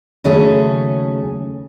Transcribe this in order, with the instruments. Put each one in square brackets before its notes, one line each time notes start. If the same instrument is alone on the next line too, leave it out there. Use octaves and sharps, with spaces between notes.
[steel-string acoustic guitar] D#2 C#3 F#3 A3 C#4 G#4